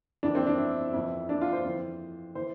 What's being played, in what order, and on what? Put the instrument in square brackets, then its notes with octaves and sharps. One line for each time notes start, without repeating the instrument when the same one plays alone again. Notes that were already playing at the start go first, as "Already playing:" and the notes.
[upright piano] F2 E3 D4
C4
D4
E4
F2 E3 E4
D4
F4
C5
F2 E3
E3 C5